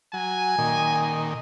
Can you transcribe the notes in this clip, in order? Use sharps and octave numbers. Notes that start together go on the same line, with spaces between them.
F#3 G#5
A#2 D#3